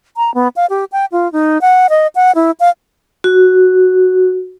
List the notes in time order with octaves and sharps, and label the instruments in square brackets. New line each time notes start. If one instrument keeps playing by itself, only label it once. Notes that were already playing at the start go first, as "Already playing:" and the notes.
[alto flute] A#5
B3
F5
G4
G5
F4
D#4
F#5
D#5
F#5
E4
F5
[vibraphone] F#4